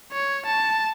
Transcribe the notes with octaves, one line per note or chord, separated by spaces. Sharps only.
C#5
A5